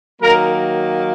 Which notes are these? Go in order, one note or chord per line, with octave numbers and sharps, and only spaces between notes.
D#3 F#3 A#3 A#4